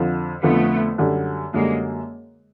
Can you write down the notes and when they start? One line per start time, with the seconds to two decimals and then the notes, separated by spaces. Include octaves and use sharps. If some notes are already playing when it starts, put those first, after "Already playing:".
Already playing: F2 D3 F3
0.43 F2 D3 F3 A3 B3
0.98 F#2 D3 G3
1.54 F#2 D3 G3 G#3 A#3